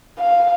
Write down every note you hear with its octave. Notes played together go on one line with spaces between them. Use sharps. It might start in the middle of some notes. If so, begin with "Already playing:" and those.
F5